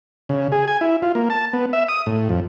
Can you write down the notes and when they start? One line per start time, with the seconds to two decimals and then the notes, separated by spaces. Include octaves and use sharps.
0.29 C#3
0.52 G#4
0.68 G#5
0.81 E4
1.02 F4
1.15 A#3
1.30 A5
1.53 B3
1.73 E5
1.89 D#6
2.06 A2
2.29 F2